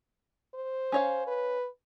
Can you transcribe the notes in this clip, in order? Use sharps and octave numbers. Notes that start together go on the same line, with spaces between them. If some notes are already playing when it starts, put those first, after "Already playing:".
C5
C#4 C#5 F5
B4